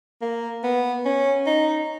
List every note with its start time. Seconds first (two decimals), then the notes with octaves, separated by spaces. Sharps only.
0.22 A#3
0.63 B3
1.05 C#4
1.46 D#4